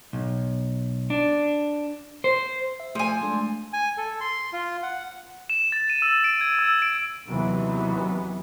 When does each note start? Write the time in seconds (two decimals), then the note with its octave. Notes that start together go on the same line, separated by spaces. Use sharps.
0.13 B1
1.10 D4
2.24 C5
2.80 E5
2.95 F3 A3 G#5
3.21 G#3 A3 D4
3.73 G#5
3.98 A4
4.21 C6
4.53 F4
4.83 F#5
5.50 E7
5.72 A6
5.90 D#7
6.02 E6
6.24 D7
6.41 G#6
6.59 E6
6.82 D7
7.27 D#2 C3 E3 F#3 B3